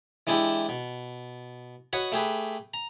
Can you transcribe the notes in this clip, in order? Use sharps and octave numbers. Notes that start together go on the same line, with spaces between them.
E3 G#3 D4 E4 G4
B2
F#4 B4 C#5 D#5
A3 G4 G#4 B4
A#5